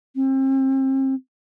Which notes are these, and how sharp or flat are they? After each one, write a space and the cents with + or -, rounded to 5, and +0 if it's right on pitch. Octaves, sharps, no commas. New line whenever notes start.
C4 +35